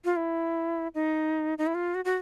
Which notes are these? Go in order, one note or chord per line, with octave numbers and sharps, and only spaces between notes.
F4
E4
D#4
D#4
E4
F4
F#4
F#4